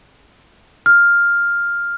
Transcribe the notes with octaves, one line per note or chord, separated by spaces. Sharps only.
F6